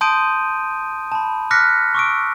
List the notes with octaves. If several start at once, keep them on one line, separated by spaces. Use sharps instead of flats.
A5 C6 D#6 G6 D7 D#7
A5 B5
D6 F6 F#6 A#6 B6 C#7
C#6 D6 E6 D7